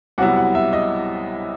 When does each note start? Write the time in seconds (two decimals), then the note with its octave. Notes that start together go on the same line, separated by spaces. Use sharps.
0.18 C2 C3 F#3 B3 E4 F#5
0.36 F#5
0.55 E5
0.73 D#5